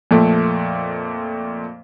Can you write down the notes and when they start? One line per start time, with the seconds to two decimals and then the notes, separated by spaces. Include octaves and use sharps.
0.11 F2 A#2 A3